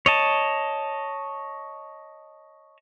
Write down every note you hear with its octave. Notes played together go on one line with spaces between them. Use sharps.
C#5 D#5 A5